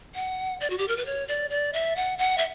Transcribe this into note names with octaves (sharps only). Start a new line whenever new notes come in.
F#5
D5
F#4
G4
A#4
B4
C#5
D5
D5
E5
F#5
F#5
E5